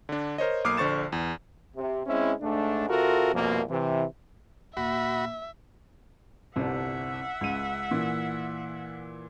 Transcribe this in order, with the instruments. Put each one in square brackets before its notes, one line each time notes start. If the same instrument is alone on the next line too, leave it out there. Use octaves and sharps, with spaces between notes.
[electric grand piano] D3 D4
A#4 C5 C#5 D#5
B1 A#3 D6 D#6 F6 C7
A#1 D3 C5 C#6 A6 E7
E2
[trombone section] C3
G#3 C4 C#4 E4
G#2 A3 D4
C3 F4 F#4 A4 A#4
C2 F2 B2 A#3
C3 E3
[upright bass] D#2 A#2 [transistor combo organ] F#4 B5 [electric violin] E5
[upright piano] G1 C2 C3 [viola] E5 F#5
[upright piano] C#2 D#7
A#2 E3